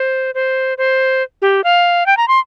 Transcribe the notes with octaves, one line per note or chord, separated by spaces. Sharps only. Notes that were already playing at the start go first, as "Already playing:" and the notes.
Already playing: C5
C5
C5
G4
F5
G5
A#5
C6